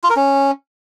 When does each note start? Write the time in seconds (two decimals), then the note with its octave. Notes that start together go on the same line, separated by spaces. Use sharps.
0.04 F4
0.10 A#4
0.16 C#4